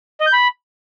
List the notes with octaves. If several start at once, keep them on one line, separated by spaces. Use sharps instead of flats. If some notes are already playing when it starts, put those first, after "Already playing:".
D#5
G6
B5